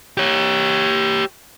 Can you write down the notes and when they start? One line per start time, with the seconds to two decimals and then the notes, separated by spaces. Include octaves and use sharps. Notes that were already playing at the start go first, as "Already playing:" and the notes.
0.18 G4 C#5